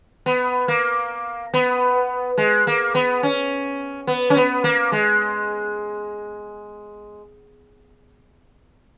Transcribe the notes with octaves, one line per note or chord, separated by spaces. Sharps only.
B3
A#3
B3
G#3
A#3
B3
C#4
B3
C#4
B3
A#3
G#3